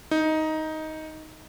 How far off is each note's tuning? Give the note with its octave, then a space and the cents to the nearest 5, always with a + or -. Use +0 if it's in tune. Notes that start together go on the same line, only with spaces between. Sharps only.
D#4 +10